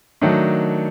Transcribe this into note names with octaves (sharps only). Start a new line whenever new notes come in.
D#3 F#3 A3 D4